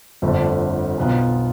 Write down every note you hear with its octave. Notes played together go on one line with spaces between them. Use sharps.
G1 F2 D3 A3
B1 B2 B3 F4